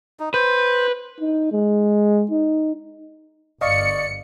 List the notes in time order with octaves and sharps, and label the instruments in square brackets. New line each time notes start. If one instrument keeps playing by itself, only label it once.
[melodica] D#4
[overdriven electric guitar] B4 [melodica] C5
[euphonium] D#4
G#3
D#4
[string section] G1 C#7 [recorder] D5 [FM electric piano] D#5 F5 C#6